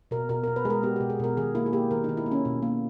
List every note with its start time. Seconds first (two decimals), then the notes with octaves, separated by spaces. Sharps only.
0.11 B2 A#4
0.29 B2 A#4
0.44 B2 A#4
0.56 B4
0.65 G#3 G#4
0.70 A#4
0.83 B3 G4
0.96 G4
1.01 B2
1.10 G#4
1.19 B2 A#4
1.37 D#3 G#4
1.55 A#3 E4
1.66 G#4
1.73 A#3 G4
1.91 D#3 A#4
2.04 D#4
2.09 D#3
2.17 E4
2.26 A#3
2.31 C#4
2.45 B2
2.62 A#3